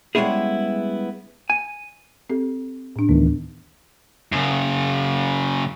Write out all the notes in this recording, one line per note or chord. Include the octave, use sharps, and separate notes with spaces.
G3 G#3 B3 C#4 E4 G#4
G#5
C4 G4 A4
A2 D4
D2 D#3 E3 B3
F#2 C#3